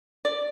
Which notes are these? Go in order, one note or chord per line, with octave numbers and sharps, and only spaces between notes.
D5